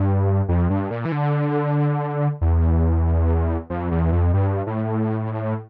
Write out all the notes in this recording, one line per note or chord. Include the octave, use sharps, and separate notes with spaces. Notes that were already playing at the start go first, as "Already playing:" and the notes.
Already playing: G2
F2
G2
A#2
E3
D3
E2
F2
E2
F2
G2
A2